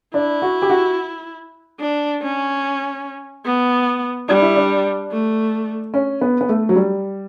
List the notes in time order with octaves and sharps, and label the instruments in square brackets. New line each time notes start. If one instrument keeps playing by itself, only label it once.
[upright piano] D4 [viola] E4
[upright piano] F#4
G4
F#4
[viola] D4
C#4
B3
[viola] G3 [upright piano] D4
[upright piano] E4
D4
[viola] A3
[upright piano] C#4
B3
B3
A3
F#3
G3